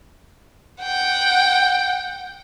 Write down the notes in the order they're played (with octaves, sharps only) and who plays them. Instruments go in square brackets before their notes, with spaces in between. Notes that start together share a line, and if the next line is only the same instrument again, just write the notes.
[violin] F#5 G5